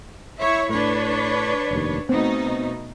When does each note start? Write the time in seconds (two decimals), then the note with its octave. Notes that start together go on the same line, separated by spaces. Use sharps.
0.39 E4 C#5 E5
0.69 A2 D4 B4 C#5
1.71 F1 D#2
2.09 B2 A3 B3 C4 D#4